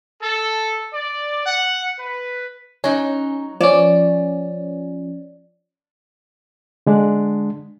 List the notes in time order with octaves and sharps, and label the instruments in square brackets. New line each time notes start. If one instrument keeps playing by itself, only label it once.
[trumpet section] A4
D5
F#5
B4
[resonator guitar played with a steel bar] F#3 D#4 [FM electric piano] C#4
[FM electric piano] F3 C#4 [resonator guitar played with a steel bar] D5
[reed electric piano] D3 G#3 D4